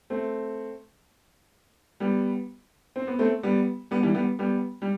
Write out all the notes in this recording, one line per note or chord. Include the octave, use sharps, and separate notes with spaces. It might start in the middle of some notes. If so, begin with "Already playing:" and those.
A3 C4
G3 B3
C4
B3
A3 C4
G3 B3
G3 B3
E3 G3
G3 B3
G3 B3
G3